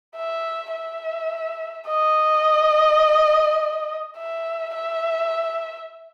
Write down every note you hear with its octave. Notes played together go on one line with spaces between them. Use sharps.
E5
E5
D#5
E5
E5